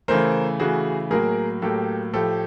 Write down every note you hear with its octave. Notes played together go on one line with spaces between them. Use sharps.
C#3 E3 A3 A#4 C5
C#3 E3 A3 F#4 G#4
A2 F#3 A#3 G#4 A#4
A2 F#3 A#3 G4 A4
A2 F3 A3 G4 A4